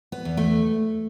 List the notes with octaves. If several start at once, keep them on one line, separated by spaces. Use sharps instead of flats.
B3
E2
A3